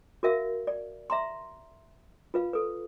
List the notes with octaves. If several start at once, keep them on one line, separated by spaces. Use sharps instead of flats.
F#4 A#4 E5 F5
D5
E5 A#5 C6
F4 B4 F5
A4 B4